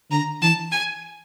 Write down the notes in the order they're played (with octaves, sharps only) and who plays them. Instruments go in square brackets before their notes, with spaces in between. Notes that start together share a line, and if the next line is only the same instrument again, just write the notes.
[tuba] D3 [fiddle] A#5
[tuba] E3 [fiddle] A5
[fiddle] G#5